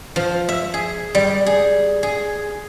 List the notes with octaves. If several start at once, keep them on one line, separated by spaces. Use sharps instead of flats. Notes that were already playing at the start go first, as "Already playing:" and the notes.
F3
E5
G#4
G3
G#4
G#4